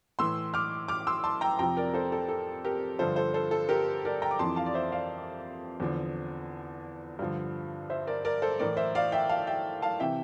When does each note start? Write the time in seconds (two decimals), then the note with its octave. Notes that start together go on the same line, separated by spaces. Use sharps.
0.19 A2 E3 C6 E6
0.54 D6 F6
0.88 D6 F6
1.07 C6 E6
1.24 A5 C6
1.41 G5 A#5
1.59 F2 C3 F3 G5 A#5
1.77 A#4 D5
1.94 A4 C5
2.12 A4
2.29 A4
2.65 G4 A#4
2.99 G2 D3 F3 A4 C5
3.16 A4 C5
3.34 A4 C5
3.51 A4
3.69 G4 A#4
4.05 A#4 D5
4.22 G5 A#5
4.31 D6
4.39 F2 E3 A5 C6
4.56 F5 A5
4.66 D5
4.74 C5 E5
4.92 D5 F5
5.80 E2 D3 F3
7.19 G2 D3 F3
7.90 C5 E5
8.07 A#4 D5
8.25 A#4 D5
8.42 A4 C5
8.59 A2 E3 A#4 D5
8.77 C5 E5
8.95 D5 F5
9.12 E5 G5
9.29 F5 A5
9.47 E5 G5
9.82 F5 A5
10.00 C3 E3 E5 G5